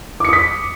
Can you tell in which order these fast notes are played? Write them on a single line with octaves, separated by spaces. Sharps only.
D6 C#7 D#6 B6